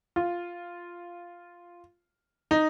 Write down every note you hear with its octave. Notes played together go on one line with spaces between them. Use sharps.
F4
D#4